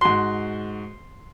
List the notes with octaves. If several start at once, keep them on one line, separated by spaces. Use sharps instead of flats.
G#2 F#4 C6